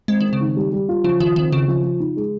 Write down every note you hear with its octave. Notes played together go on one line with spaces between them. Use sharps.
G#3 C4
D#3 C4
C#3
D#3
G3
G3
F4
C#3 F3
D#3 F4
D#3 C4
C#3 F4
F3
F4
D#4
G#3